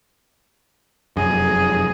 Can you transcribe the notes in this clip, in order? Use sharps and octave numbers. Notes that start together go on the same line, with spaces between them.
F1 F#2 G#4